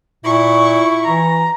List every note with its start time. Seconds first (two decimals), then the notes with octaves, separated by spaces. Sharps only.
0.24 A#2 E4 C#6
1.04 E3 A#5